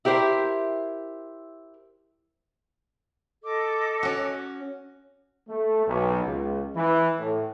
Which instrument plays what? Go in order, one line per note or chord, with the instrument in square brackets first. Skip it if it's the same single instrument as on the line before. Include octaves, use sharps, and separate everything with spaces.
[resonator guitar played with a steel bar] E4 G4 A#4 C5 E5
[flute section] A4 D#5 D6
[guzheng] C#4 F#4
[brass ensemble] A3
B1
C#2
E3
A2